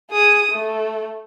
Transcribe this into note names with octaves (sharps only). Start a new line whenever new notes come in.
G#4 D#6
A3